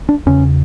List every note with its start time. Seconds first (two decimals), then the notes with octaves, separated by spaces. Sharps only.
0.09 D4
0.26 E2 C#3 C#4